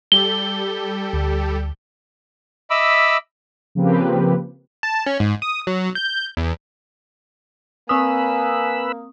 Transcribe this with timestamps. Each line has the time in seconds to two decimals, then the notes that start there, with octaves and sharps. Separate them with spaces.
0.12 G3 G4 A4 G7
1.13 D2
2.70 D#5 E5 B5 D6 E6
3.75 C#3 F3 A#3 C4 G4 B4
4.83 A5
5.06 C#4
5.20 G#2
5.42 D#6
5.67 F#3
5.95 G6
6.37 E2
7.89 A#3 C4 B4 G#5 B5 D#6 E6